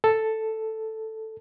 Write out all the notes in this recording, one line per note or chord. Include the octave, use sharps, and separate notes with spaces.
A4